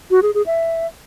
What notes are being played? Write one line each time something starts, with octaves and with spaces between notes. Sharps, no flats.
F#4
G#4
G#4
E5